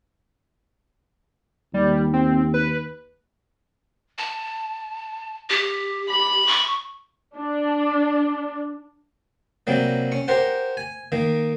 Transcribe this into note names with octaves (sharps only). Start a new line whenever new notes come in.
D#2 G3
C4
B4
A5
G4
B5
C#6
D4
C3 F#3 G3 A#3
C#4 C#6
G4 A#4 C5 F#5
G#5
D#3 A#3